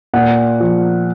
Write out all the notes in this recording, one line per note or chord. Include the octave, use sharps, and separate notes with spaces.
A#2 F#5
F3